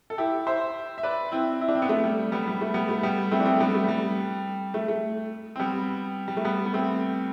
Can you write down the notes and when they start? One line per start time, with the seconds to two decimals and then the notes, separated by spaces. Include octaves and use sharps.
0.10 A4
0.18 E4 G4
0.47 C5 E5
0.98 E5
1.03 B4 D5
1.32 C4 E4
1.61 E4
1.68 D4
1.75 C4
1.82 B3
1.89 A3
2.04 G3
2.32 G3 B3
2.47 G3
2.61 A3
2.74 G3 B3
2.89 A3
3.03 G3 B3
3.31 A3 C4
3.40 D4
3.45 A3 C4
3.60 G3 B3
3.74 A3
3.88 G3
4.74 A3
4.88 A3
5.56 C4
5.59 G3 B3
6.28 G3
6.37 A3
6.45 G3 B3
6.66 B3
6.73 A3 C4